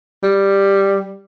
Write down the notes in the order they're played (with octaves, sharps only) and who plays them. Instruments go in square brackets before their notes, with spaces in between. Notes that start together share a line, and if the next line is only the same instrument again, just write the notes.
[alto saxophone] G3